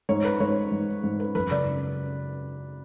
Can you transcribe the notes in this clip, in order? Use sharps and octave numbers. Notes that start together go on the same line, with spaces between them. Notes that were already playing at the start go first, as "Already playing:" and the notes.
G#2 C#5
B4
G#2 C#5
G#2
G#2
B4
F#2 B4
C#3 D5